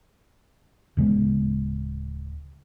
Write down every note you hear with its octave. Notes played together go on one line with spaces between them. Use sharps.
D1 C#3 G#3 B3